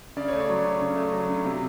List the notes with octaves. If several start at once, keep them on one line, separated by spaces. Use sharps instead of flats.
C#3 D5
A3 C#5
D5
F#3
C#3
C#3
A3
F#3
C#3
C3